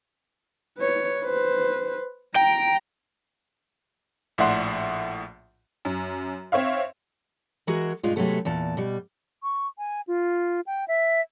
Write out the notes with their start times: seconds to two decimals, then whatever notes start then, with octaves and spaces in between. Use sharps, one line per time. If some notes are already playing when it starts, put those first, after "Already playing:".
0.78 B4 C#5
1.24 B4 C5
2.36 G5 A#5
4.38 A#1 A2 D5 E5 F#5 C6
5.85 F#2
6.52 C4 C#5 E5 F5
7.67 E3 G#3 F#4 G#4 A#4
8.03 G2 B2 G#3 D#4 F4
8.16 C3 F#3 G#3 A3 B3 A4
8.45 E2 A#2 A5
8.77 B2 G3
9.43 C#6
9.78 G#5
10.08 F4
10.67 G5
10.88 E5